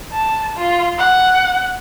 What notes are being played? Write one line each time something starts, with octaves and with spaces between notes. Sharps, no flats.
A5
F4
F#5